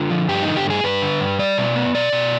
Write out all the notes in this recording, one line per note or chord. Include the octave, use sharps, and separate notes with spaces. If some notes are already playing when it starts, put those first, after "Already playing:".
Already playing: D3 F4
F3
G2 G4
D#4
D3
G4
G2 G#4
G2 B4
D3
G2
G3 D5
B2
B3
B2 D5
B2